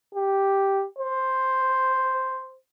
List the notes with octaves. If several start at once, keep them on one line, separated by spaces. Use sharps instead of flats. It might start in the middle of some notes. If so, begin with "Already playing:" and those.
G4
C5